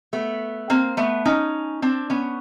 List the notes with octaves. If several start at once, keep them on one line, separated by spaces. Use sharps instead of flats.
A3 B3
A#3 C4
A3 B3
C#4 D#4
C4 D4
B3 C#4